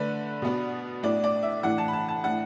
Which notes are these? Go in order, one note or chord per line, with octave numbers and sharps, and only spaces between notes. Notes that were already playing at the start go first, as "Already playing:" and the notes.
Already playing: D3 A3 D4 B4
B2 B3 D4
A2 A3 D4 D5
D5
E5
A2 E3 A3 D4 F#5
A5
B5
A5
A5
A2 A3 D4 F#5